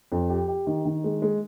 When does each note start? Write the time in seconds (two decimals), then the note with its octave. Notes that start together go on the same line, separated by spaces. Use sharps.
0.12 F2
0.30 G4
0.48 G4
0.67 D#3
0.85 D#3
1.04 G#3
1.22 G#3